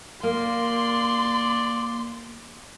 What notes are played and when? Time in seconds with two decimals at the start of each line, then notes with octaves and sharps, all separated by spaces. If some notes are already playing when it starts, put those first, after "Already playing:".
0.23 A#3 D5 C6